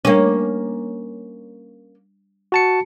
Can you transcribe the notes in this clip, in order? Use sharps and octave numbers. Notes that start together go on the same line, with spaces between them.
G3 A#3 C#4 D4
F#4 A5 C#7